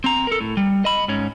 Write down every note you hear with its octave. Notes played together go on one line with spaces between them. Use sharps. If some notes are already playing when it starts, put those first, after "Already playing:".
C4 A#5
A4 A#4
A2
G3
D#5 B5
G#2 C#4